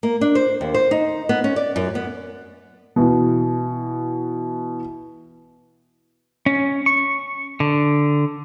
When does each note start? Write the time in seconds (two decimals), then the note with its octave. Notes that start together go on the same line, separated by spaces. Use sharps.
0.03 A#3
0.21 D4
0.35 C5
0.61 D#2
0.74 C5
0.91 D#4
1.29 B3
1.44 C#4
1.56 D5
1.76 F#2
1.95 B3
2.96 B2 E3
6.46 C#4
6.86 C#6
7.60 D3